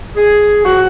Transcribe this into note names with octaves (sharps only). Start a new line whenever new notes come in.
G#4
A#2 F3 F#4